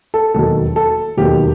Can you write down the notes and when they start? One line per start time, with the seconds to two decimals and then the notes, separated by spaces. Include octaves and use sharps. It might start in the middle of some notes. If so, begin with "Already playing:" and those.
0.14 A4
0.34 E1 D#2 D#3 F#3 A4
0.76 A4
1.17 E1 D#2 D#3 F#3 G4